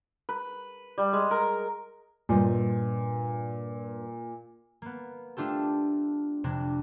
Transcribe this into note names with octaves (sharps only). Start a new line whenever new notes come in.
B4
G3
G#3
A#4
G2 A#2 C5 D#5
A#3 B3
A3 D4 F4 G4 A4
F2 C3 D4